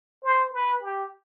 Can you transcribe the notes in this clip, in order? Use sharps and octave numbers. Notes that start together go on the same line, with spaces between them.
C5
B4
G4